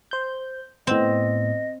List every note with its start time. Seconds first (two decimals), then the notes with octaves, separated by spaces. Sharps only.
0.11 C5 G6
0.87 A2 B3 C4 D#5